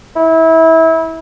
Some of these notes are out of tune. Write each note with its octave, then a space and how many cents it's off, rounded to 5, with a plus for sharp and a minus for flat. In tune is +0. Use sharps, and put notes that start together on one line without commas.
E4 -25